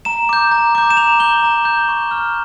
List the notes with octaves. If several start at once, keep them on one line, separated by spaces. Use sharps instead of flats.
A#5 E7
D6 G6
A#5
D6 G6
E7
A#5 F7
D6 G6 G7
A#5
D6 G6
C#6
F6